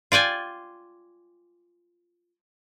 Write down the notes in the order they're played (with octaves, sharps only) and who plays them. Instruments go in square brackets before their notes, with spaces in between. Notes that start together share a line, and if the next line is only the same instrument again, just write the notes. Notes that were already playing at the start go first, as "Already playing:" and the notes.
[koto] F4 D5 G5 G#5